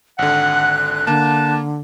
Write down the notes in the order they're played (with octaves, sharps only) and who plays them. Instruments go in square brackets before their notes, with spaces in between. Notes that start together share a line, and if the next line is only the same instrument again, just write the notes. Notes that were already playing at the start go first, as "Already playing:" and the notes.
[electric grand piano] G#1 D3 [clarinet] F#5 [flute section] F#6
[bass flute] D3 [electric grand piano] A#3 [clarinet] A5